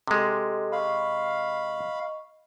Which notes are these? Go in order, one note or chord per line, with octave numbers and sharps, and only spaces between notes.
C3 G#3 G4 A4 D#5
D#5 F5 B5 C#6